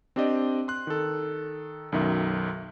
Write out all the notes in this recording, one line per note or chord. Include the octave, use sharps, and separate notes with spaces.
C4 D4 G4 D5 D#5
C6 F#6
D#3 A4
B1 F#2 D#3 E5